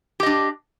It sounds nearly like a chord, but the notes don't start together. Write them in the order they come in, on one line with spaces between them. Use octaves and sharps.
G4 D#5 D4